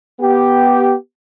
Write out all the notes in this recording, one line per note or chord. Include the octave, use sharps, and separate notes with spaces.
B3 G4